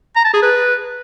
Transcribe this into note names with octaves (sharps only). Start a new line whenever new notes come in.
A#5
A5
G#4
B4